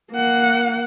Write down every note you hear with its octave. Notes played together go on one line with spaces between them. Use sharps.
A#3 F#5